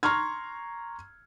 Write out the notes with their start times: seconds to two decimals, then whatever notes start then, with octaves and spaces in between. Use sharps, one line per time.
0.03 A#5 C6 C#6 F6 G#6